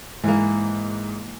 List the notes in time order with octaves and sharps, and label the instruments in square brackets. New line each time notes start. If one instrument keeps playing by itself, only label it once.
[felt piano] G#2 [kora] E3 A#3